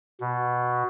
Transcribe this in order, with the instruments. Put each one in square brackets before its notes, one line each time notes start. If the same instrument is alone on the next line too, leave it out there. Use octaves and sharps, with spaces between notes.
[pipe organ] B2